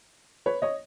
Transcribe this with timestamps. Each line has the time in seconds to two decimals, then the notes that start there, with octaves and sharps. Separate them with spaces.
0.46 B4 C#5
0.62 C#5 D#5